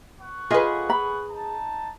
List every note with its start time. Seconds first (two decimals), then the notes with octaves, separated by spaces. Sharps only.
0.20 B3 F#5 C#6
0.51 F4 G#4 B4 D#5
0.90 B5
1.30 D#4 A5